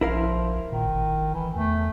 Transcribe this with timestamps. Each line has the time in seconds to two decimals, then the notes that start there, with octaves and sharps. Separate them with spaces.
0.01 A#1 F3 E4 A#4 F5
0.72 A#2 D#3
0.86 G#1
1.34 E3
1.55 E2 A3